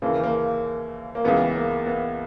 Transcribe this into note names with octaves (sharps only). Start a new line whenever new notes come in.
D#2 C#3 E3 A#3
A#3
A#3
C#2 C#3 E3 B3
A#3
B3